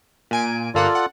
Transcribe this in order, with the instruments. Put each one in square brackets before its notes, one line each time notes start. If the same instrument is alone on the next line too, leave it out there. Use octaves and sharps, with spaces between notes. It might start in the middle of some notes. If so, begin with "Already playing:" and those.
[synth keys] A#2 G#5 D7
[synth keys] G1 A#3 F#5 [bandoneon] F4 A4 D5
[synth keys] F#5